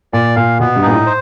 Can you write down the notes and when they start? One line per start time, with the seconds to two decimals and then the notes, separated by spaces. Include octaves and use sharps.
0.13 A#2 D5
0.36 A#2 F5
0.60 B2 B3
0.76 G2
0.82 A#2 D#4
0.91 A2
1.06 C5